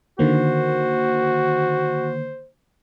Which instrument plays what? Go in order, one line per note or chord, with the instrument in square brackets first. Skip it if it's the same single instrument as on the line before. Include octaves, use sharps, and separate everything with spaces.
[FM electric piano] D3 D#3 A#3 [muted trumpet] F#4 [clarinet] C5